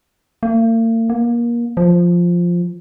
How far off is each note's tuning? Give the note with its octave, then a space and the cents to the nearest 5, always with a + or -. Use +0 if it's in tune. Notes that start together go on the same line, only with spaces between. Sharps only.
A#3 -45
A#3 +25
F3 +0